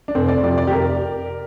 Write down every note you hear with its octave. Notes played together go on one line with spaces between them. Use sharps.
D4
F1 C4
D5
F2 C3 D5
D5
G4
F1 A#4